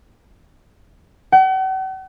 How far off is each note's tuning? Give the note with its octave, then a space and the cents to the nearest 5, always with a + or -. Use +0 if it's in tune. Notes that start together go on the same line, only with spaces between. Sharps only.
F#5 +45